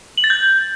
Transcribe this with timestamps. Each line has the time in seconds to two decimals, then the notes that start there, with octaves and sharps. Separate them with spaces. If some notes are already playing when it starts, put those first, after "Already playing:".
0.18 F#7
0.24 A6
0.30 G6